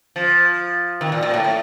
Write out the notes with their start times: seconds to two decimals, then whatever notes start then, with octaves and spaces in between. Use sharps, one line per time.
0.16 F3
1.01 D#3
1.12 A#2
1.23 A#2
1.34 A2
1.44 A2